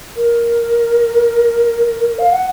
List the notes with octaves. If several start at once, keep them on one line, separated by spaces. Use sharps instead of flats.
A#4
F5
F#5